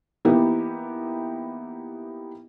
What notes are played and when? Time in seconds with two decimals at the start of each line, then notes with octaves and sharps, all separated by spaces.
0.25 E3 A#3 B3 D#4 E4 G4